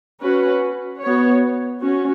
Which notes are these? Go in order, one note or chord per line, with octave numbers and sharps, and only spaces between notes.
C#4 F#4 B4
B3 F#4 C#5
C#4 F#4